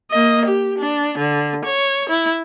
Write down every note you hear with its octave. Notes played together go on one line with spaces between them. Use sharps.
A#3 D#5
G4
D4
D3
C#5
E4